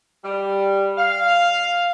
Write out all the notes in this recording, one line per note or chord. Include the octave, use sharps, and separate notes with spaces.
G3
F5